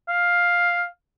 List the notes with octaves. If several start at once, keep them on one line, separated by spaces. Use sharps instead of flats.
F5